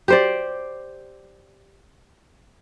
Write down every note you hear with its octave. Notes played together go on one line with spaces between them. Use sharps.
G4 C5 D5